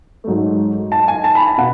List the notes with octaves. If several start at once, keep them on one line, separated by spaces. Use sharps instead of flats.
G#2 F#3 A3
A5
G#5
A5
B5
A5
B2 F#5